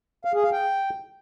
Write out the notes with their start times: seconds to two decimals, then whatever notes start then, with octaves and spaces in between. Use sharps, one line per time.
0.25 F5
0.34 G#4
0.43 F5
0.52 G5